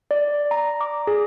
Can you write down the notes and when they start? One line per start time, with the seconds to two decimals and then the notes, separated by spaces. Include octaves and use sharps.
0.11 D5
0.51 A#5
0.81 D6
1.07 G#4